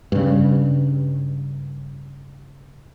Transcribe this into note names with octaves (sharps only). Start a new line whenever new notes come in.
G2 C#3